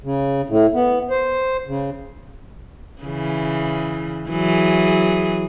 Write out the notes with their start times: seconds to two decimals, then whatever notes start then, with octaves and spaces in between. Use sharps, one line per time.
0.04 C#3
0.49 A2
0.74 B3
1.10 C5
1.67 C#3
3.02 C#3 E3
4.29 E3 F#3 G#4